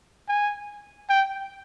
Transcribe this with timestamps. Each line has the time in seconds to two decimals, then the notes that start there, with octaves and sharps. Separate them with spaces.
0.28 G#5
1.09 G5